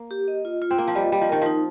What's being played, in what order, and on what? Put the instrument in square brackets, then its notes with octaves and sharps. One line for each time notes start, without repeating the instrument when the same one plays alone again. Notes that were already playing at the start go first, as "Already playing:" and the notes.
Already playing: [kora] A#3
[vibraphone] G4
D#5
F4
F4
[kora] C4
[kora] A#3 [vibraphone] F4
[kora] F3
[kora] G3 [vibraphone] D#5
[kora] G3 [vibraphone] D#5
[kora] F3
[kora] D#3 [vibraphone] A#4
[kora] F3 [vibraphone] D#4